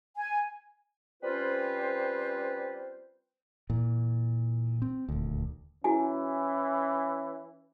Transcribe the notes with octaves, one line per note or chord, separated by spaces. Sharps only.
G#5
G3 C4 C#4 F4 B4 C5
A#2 E3
C4
D#1 D2
E3 C#4 E4 F#4 G#5